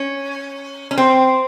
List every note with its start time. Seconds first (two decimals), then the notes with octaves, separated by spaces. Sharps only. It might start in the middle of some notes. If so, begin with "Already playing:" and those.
Already playing: C#4
0.91 C#4
0.98 C4